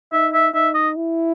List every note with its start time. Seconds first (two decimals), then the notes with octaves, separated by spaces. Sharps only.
0.13 D#4 E5
0.34 E5
0.54 D#4 E5
0.75 D#5
0.96 E4